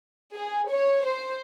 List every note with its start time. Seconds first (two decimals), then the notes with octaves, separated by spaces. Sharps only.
0.36 G#4
0.70 C#5
1.06 C5